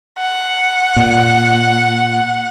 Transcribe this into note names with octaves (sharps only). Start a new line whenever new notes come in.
F#5
A#2